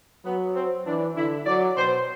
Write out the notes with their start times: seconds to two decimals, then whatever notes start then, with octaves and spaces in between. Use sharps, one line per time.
0.24 F#3 B3
0.55 C4
0.86 E3 D4
1.16 D3 E4
1.46 F#3 D5
1.77 B2 C5